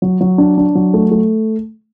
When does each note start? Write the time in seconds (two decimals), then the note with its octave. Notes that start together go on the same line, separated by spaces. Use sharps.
0.02 F#3
0.21 F#3
0.38 D4
0.58 D4
0.75 F#3
0.94 A3
1.11 A3